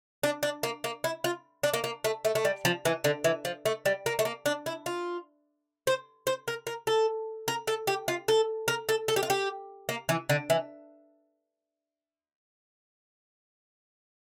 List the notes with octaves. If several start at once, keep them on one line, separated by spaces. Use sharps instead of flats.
D4
D4
A#3
A#3
E4
F4
D4
A#3
A#3
A3
A3
A3
G3
F3
E3
D3
E3
F3
A3
G3
A#3
A3
A#3
D4
E4
F4
C5
C5
A#4
A#4
A4
A#4
A4
G4
F4
A4
A#4
A4
A4
G4
F4
G4
A#3
E3
D3
E3